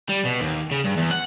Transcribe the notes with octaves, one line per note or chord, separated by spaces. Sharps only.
G3
B2
D#2
C#3
G2
E2
F#5